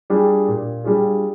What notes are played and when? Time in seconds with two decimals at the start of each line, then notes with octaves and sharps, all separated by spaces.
0.10 G3 D4 F4 G#4
0.48 A#2
0.84 G3 D4 F4 G#4